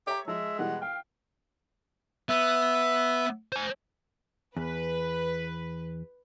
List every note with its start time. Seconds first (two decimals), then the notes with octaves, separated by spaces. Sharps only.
0.07 G4 C#5 E5 A#5
0.28 F3 G#3 E5
0.59 B2 E3 G3 F#5
0.82 F5 G5
2.29 B3 E5
3.52 C5 G#5
4.57 E2 B4